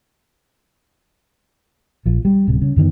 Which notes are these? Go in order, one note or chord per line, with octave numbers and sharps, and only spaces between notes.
A#1 F3
G3
D1 C3
C#3
F#2 D3 D#3 B3